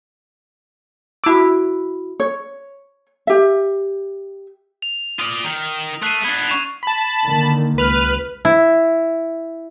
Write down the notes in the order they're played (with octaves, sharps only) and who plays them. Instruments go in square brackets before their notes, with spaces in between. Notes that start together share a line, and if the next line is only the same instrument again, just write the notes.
[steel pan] E4 D6 [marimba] F#4 E6
[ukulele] C#5
G4 E5
[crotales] F7
[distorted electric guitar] F4 D5 [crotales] D#6 F6
[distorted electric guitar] D#3
[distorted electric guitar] A3 [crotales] F#6 C7 D#7
[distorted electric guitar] B3 D4 [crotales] G#6
[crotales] C#6 E7 F7
[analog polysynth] A5 B5
[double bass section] D3 D#3 A#3
[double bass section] C#2 [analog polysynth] B4 F6
[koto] E4